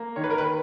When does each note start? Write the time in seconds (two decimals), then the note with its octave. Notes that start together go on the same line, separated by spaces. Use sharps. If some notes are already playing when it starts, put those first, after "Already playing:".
Already playing: A#3
0.16 D#3 C#5
0.24 B4
0.30 A#4
0.38 B4